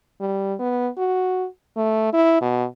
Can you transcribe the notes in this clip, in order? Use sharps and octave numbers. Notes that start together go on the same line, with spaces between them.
G3
B3
F#4
A3
E4
B2